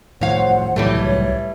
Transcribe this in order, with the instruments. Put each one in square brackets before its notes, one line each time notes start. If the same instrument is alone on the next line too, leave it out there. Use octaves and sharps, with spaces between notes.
[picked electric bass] A2 D#3 F3 [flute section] C5 F#5 [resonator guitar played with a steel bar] C#5 F5
[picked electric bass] C2 A2 F#3 [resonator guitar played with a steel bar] E3 G3 A3 [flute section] C#5